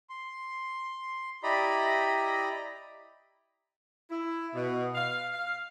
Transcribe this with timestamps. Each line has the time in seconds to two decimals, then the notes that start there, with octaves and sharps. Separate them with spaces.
0.10 C6
1.43 E4 G4 D5 D#5 A#5 B5
4.11 E4
4.54 B2
4.95 F5
5.33 F5